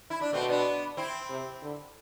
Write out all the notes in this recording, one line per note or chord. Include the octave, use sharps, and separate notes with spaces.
E4
D4
B2 A3 C4
B3 D4
C4 E4
C3
D3